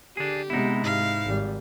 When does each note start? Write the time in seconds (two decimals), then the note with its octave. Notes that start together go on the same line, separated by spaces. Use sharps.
0.17 D3 D4 G4 G#4
0.50 C3 G#3 B3 D#4 E4
0.84 G#2 F5
1.26 G#1 G3